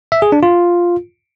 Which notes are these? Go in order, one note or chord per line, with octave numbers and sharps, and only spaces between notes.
E5
G#4
D4
F4